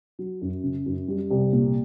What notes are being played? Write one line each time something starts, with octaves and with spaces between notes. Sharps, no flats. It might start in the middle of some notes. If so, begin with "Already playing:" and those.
F#3
F#2
C#3
F#2
G3
C2
A#2